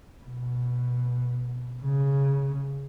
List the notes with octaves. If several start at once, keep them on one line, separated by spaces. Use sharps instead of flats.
B2
C#3